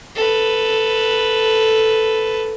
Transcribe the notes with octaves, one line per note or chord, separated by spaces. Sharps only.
A4 B4